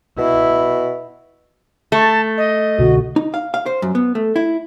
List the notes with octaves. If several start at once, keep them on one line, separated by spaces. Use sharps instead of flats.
B2 E4
A3 A5
D#5
C2 B2 D3 F#4
D#4
F5
F5
C5
F#2
B3
A3
E4